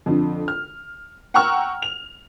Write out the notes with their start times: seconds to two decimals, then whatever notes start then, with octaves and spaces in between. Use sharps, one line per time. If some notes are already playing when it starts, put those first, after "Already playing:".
0.06 F2 D3
0.48 F6
1.34 F#5 G5 A#5 C#6 E6 F6
1.82 F7